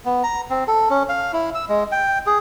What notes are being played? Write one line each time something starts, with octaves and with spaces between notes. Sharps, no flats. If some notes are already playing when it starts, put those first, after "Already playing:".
B3
A#5
C4
A4
C#4
F5
E4
E6
G#3
G5
G#4